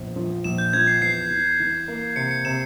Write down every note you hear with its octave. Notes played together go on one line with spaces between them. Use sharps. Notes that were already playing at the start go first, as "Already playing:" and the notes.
Already playing: A#1 E2
F3
A#1 E7
G6
F3 G#6
C7
E2 C7
E3
E3
A#3
C3 C#7
C#7
C3 E7